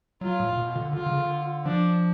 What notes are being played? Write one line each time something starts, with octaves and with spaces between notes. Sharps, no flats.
F#3 F4
A2
A2
B2
D3
D3 F4
C#3
D3
F3 D4